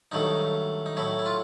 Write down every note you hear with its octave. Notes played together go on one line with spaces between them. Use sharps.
G2 D#3 F#3 A3 D#4
D#4
A2 F#3 A3 E4
E4
F4